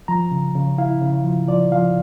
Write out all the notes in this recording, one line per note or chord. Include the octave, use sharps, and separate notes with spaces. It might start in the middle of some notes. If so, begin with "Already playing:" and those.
F3 A#5
C#3
C#3
E4 F5
C#3
F3
F3 D5
F3 F5